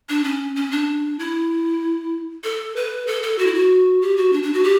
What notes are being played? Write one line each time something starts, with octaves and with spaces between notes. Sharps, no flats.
D4
C#4
C#4
D4
E4
A4
B4
A4
A4
F#4
E4
F#4
G4
F#4
D4
D4
F#4
G4